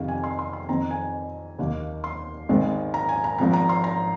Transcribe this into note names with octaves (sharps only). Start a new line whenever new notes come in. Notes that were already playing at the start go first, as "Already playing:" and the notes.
Already playing: F2 C3 D#3 F5
G#5
C6
C6
C6
F2 D#3 C4 A#5
G#5
D#2 D#3 A#3
C6
G#1 G#2 D#3 G#3 C4
A#5
G#5
A#5
G#1 G#2 F3 C4 A#5
A#5
C6
A#5